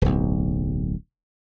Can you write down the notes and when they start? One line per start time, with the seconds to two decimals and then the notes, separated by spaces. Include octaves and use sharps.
0.02 D1 B1